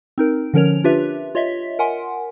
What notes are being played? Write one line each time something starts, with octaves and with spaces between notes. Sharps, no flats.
C4 D#4 A#4
D3 F3 C#4 A#4 C#5 F7
D4 F4 G4 B4 E5
F4 C#5 D#5 E5 B6
A#4 F#5 G#5 C6